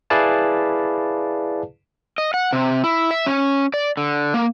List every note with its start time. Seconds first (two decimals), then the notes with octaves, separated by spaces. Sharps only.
0.10 E4 G#4 B4 D5 F5 A5
2.18 D#5
2.34 F#5
2.53 C3
2.84 E4
3.11 E5
3.26 C#4
3.74 D5
3.97 D3
4.34 A#3